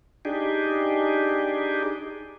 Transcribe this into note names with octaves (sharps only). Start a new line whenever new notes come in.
D4 D#4 G4 G#4